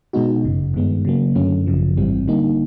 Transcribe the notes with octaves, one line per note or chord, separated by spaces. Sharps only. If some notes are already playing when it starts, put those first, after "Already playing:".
B2 G#3 B3 D#4 F#4
G1 F#2 C#3
G2 D#3 G#3 B3
C#3 F#3 A#3
F#2 D3 F#3 A3 C#4
G#1 F#2 C#3 F3
A1 G#2 E3 G3 C4
D3 G3 A#3 D#4